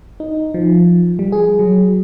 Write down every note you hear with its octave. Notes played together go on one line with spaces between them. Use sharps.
D#4
F3
G3
G#4
F#3